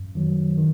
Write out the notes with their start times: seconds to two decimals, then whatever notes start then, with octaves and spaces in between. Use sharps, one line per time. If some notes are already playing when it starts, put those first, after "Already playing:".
Already playing: F#2
0.15 D#3 F#3
0.58 D#3